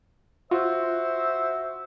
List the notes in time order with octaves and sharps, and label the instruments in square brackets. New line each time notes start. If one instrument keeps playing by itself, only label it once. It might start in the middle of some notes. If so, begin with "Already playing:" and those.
[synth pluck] F4 [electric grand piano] F#4 [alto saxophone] C5 [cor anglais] E5